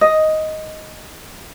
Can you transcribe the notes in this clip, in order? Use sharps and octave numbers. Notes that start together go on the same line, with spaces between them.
D#5